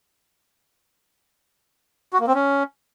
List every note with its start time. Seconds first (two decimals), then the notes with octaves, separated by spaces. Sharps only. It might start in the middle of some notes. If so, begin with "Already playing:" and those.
2.13 F#4
2.20 A#3
2.27 C4
2.35 C#4